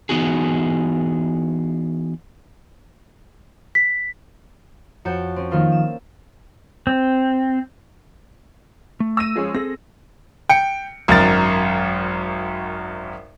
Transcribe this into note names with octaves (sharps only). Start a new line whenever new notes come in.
E3 F3 B3 D#4 F#4 G#4
B6
F2 F#4 C#5 A5 G6 C#7
C4 C#4
D#3 F3 A#3 F4 A4 A#4
E7
C4
A3
E6 A#6 D#7
F3 G#3 C#4
C4 G#4 A4 A#6
G5 C#7
G#1 F#2 A#4 A#5 A6